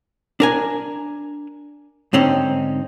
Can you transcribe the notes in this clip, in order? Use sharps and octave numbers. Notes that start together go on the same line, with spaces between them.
D4 A#4 G#5
G#2 D3 C4 C#4 D#4